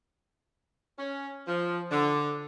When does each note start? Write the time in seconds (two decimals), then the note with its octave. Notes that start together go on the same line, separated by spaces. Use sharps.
0.99 C#4
1.48 F3
1.91 D3